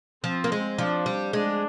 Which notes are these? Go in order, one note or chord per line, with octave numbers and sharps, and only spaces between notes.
F3 C4
A#3
G#3
F3 D4
G3
G#3 D4